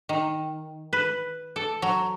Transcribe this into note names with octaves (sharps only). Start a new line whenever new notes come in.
D#3
B4
A4
F#3